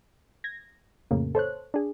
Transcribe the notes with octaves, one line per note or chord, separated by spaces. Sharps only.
G#6 A#6
F2 A2 C#3 A#3
A4 C5 C#5 F#6
D4 G#4